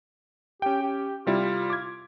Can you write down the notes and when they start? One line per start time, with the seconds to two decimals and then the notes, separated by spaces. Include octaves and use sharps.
0.62 C#4 G4 G5
0.82 G4
1.27 C3 G3 E4 F4
1.70 D6 G#6